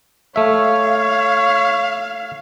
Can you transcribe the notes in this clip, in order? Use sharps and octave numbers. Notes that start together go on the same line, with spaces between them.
A3 C#5 E5 F5